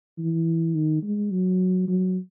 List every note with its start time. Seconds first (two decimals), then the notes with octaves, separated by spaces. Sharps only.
0.19 E3
0.75 D#3
1.03 G#3
1.31 F#3
1.88 F#3